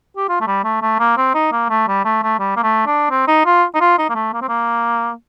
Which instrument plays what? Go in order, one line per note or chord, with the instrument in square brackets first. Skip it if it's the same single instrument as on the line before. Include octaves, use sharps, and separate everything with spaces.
[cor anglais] G4
F4
A3
G3
A3
A3
A#3
C4
D#4
A#3
A3
G3
A3
A3
G3
A#3
A3
D4
C4
D#4
F4
D#4
F4
D#4
A#3
A3
A#3
C4
A#3